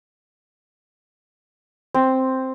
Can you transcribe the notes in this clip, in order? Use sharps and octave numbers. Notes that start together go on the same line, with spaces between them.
C4